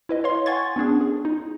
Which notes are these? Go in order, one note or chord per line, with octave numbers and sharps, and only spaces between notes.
E4 B4 D#5
C#5 F5 C6
F#5 G#5 C6 C#6 G#6 A6
B3 C#4 D4 G#4
G#4
D#4